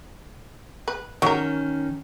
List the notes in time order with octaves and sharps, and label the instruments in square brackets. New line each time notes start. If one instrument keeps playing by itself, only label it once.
[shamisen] B4
[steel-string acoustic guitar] D#3 C#4 [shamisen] F#3 A#4